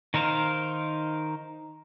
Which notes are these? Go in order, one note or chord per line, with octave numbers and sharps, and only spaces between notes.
D#3 D#4 A#4 C5 F5